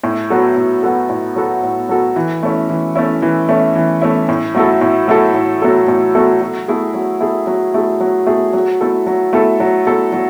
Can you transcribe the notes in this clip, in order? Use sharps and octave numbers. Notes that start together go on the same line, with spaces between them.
A2
F#3 B3 F#4 A4
A2
F#3 B3 F#4 A4
A2
F#3 B3 F#4 A4
A2
F#3 B3 F#4 A4
E3
A3 C#4 E4
E3
A3 C#4 E4
E3
A3 C#4 E4
E3
A3 C#4 E4
A2
F#3 A3 E4 A4
A2
F#3 A3 E4 A4
A2
F#3 A3 E4 A4
A2
F#3 A3 E4 A4
F#3
A3 E4 G#4
F#3
A3 E4 G#4
F#3
A3 E4 G#4
F#3
A3 E4 G#4
F#3
A3 E4 A4
F#3
A3 E4 A4
F#3
A3 E4 A4
F#3